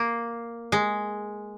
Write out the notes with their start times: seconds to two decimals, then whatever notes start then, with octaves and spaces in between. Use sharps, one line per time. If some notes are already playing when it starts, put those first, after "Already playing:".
Already playing: A#3
0.72 G#3